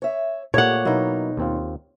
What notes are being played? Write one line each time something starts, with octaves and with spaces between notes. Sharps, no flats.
C#5 E5
A#2 A3 A#3 G4 C#5 F#5
B2 F#3 A#3 D#4 E4
D#2 C4 F4